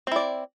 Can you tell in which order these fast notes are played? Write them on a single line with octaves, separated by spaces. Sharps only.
C4 E4 D5